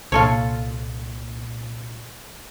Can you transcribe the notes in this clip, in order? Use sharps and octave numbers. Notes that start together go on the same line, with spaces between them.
C2 A#2 F4 A4 C#5